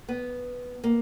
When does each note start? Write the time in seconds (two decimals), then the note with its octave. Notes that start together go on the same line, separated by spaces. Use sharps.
0.08 B3
0.84 A#3